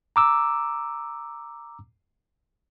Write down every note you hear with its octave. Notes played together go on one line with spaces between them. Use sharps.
A#5 D6 E6